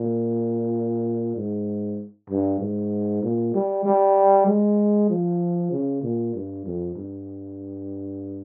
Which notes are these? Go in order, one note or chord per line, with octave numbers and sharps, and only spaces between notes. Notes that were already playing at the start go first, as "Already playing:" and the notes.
Already playing: A#2
G#2
G2
G#2
A#2
G3
G3
G#3
F3
C#3
A#2
G2
F2
G2